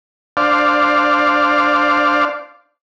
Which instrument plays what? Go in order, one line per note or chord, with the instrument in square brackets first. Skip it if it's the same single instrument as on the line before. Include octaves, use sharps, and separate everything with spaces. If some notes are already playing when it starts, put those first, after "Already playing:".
[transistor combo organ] D4 C5 D5 F5